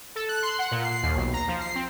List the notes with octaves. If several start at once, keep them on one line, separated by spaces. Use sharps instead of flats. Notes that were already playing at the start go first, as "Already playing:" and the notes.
A4
F#6
C6
F#5
A#2
C7
D#2
B1
A#5
F3
C7
C4